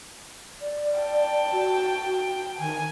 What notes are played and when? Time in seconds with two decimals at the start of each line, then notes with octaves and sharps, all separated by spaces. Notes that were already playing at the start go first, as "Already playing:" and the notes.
0.62 D5
0.99 G5 A5
1.53 F#4
2.59 D#3 G#5